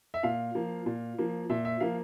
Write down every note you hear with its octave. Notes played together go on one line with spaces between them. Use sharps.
E5
A#2 F5
F3 A#3
A#2
F3 A#3
A#2 E5
E5
F3 A#3 F5